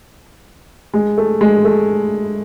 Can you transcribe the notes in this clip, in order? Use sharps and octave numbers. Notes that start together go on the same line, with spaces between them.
G#3
A3
G#3
A3